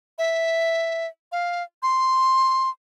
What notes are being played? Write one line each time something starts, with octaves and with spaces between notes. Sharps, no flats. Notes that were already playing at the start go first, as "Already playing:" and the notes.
E5
F5
C6